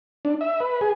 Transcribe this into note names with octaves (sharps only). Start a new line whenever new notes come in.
D4
E5
B4
G#4